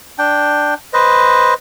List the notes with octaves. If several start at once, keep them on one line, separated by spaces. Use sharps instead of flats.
D4 G5
B4 C5 D#5